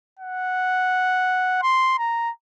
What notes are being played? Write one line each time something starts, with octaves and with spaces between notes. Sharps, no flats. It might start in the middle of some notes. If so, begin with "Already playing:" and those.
F#5
C6
A#5